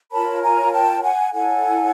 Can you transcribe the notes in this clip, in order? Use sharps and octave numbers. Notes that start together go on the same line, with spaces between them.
F4 A#4 C#5 A5 B5
G#5 A#5
G5 A5
F#5 G#5
E4 A4 C#5 F#5 G#5